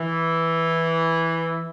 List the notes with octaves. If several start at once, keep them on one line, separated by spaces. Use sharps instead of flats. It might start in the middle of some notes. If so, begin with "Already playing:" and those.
Already playing: E3